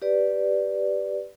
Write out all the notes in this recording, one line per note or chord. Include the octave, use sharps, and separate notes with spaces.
G4 B4 D5